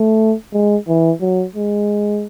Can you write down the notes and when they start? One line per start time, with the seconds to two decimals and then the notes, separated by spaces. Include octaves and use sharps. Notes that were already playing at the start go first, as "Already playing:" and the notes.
Already playing: A3
0.53 G#3
0.88 E3
1.21 F#3
1.56 G#3